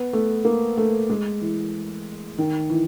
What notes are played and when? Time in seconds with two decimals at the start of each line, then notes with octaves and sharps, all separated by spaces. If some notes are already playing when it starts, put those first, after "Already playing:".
Already playing: B3
0.13 A3
0.45 A#3
0.77 A3
1.10 G#3
1.41 E3
2.38 D#3
2.70 E3